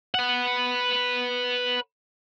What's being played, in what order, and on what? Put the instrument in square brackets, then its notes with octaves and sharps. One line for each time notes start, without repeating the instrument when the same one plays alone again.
[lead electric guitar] B4 F#5